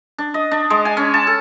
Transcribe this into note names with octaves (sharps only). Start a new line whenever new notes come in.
D4
D#5
D4
G#3
G#5
C#4
A5
A4